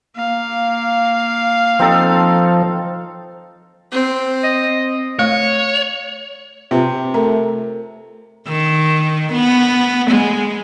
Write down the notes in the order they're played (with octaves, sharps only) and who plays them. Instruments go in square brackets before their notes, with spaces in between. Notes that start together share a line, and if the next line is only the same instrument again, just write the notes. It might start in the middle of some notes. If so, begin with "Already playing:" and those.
[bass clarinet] A#3 [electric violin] F5
[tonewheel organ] F3 [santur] C4 D#4 A4
[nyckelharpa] C4
[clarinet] D#5
[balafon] A3 [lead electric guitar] C#5
[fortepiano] C3 [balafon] F4 B4
[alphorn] A3 [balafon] A#4 A#5
[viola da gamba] D#3
B3
G#3